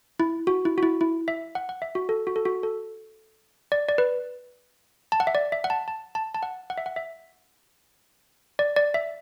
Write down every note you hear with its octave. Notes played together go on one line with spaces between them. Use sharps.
E4
F#4
E4
F#4
E4
E4
E5
F#5
F#5
E5
F#4
A4
F#4
A4
F#4
A4
D5
D5
B4
A5
F#5
E5
D5
E5
F#5
A5
A5
A5
A5
F#5
F#5
E5
F#5
E5
D5
D5
E5